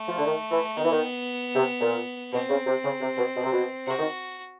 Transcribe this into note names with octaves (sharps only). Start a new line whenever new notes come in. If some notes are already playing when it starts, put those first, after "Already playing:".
Already playing: A3
F3
D3
D#3
E3
D#3 B3
E3
D#3
C3
A#2
B2 C4
C#3
C3
C#3
C3
B2
B2
C3
B2
C3 F#4
D#3